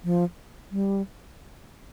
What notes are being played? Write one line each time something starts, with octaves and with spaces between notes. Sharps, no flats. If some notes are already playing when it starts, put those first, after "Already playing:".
F3
G3